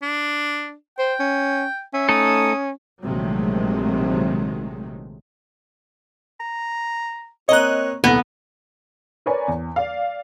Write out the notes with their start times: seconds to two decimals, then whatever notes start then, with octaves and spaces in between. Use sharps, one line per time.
0.02 D4
0.99 C5 G5
1.20 C#4
1.94 C#4 E5
2.09 A3 D#4 A4 D#6
3.03 A#1 C3 D#3 F#3 G#3 A3
6.40 A#5
7.49 A#3 C4 C#5 D#5 A#5 F#6
8.04 D#1 C2 A3 B3 A#6
9.26 A#4 B4 C#5 D5 G#5 A#5
9.48 E2
9.76 D5 F5